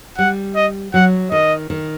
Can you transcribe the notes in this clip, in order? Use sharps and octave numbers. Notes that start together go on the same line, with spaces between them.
G3 F#5
D#5
F#3 F#5
D#3 D#5
D#3